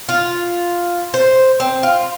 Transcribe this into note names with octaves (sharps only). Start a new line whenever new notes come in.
F4
C5
C4
F4